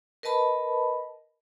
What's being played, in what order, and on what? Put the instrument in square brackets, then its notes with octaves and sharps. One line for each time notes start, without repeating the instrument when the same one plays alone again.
[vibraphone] A#4 B4 D#5 A5 B5